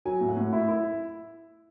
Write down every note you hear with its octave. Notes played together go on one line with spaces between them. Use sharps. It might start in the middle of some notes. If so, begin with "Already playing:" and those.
F#3 G#5
A2
F#5
A2
E4 E5
E4